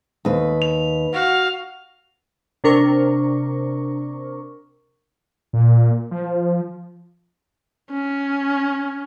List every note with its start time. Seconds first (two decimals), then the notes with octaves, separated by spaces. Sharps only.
0.25 D#2 B4
0.62 F7
1.13 F#4 F5
2.64 C3 D4 A#4 C#6
5.53 A#2
6.11 F3
7.91 C#4